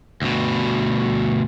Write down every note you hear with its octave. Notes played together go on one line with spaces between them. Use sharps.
D2 B2